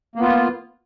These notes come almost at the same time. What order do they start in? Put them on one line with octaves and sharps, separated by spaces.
A#3 B3 F4